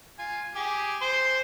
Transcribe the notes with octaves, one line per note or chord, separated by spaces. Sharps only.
F4 G#5
G4 G#4
C5 C6